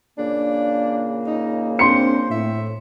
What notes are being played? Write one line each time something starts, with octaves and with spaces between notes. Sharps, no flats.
A#2 C#3 A#3 D4
D#4
C4 D4 C5 C6 C#7
A2 E5